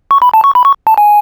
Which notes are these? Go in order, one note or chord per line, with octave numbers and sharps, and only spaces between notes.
C#6
B5
A5
C#6
B5
C#6
A5
G#5